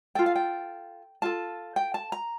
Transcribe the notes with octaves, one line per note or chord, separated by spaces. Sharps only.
F4 A4 G5
F5
G5
F4 A4 A5
G5
A5
A#5